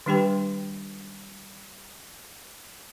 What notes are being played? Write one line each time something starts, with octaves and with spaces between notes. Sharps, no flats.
D#3 G3 D4 G4 B4 G5